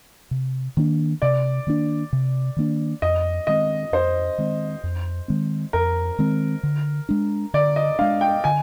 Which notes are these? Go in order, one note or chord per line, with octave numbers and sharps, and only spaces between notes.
C3
D#3 A#3 D4
C3 D5
D#3 A#3 D4
C3
D#3 A#3 D4
F2 D#5
D#3 G#3 C4 D#5
F2 C5
D#3 G#3 C4
F2
D#3 G#3 C4
F2 A#4
D#3 G#3 C4
D3
G#3 D4
D3 D5
D#5
G#3 D4 F5
G5
D3 G#5